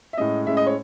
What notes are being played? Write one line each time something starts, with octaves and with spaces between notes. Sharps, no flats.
E5
A2 G#3 C#4 D#5
A2 G#3 C#4 E5
D#5
C#5